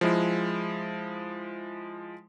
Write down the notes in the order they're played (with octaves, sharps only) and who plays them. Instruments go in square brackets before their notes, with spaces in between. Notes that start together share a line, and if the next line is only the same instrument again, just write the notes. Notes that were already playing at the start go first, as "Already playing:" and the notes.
[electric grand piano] F3 G#3 E4